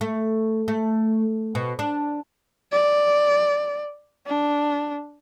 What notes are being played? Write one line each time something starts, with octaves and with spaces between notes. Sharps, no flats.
A3
A3
B2
D4
D5
D4